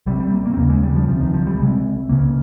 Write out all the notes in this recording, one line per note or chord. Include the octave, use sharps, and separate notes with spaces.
C2 C3 G3
G3
A#3
A#3
C4
D#2 C#3 A#3
G#3
G3
F3
C#2 C3 F3
D#3
F3
G3
C2 C3 G#3
C#2 C#3 A#3